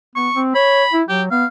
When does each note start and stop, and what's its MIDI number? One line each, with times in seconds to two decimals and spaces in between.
0.15 0.29 59
0.15 0.41 85
0.34 0.50 60
0.55 0.84 73
0.55 0.97 83
0.93 1.03 64
1.09 1.29 54
1.09 1.22 67
1.31 1.44 59
1.31 1.46 77